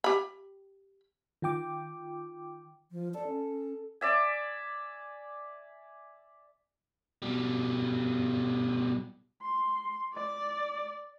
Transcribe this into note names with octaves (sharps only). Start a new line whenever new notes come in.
G4 B5
D#3 F4 G5 D6
F3
A4 D5
C#4
D5 E5 G#5
B2 G3
C6
D5